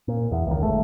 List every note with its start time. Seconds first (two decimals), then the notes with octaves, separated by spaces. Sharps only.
0.08 A#2
0.32 E2
0.47 C#2 D#3
0.61 G1 G#3 A3